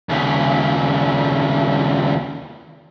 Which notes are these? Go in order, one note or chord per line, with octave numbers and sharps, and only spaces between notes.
D#2 C#3